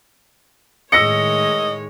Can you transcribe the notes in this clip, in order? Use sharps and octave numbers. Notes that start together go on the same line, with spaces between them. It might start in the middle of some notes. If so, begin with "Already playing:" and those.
A2 D#3 G#3 C#5 D#5 E6 A#6 C#7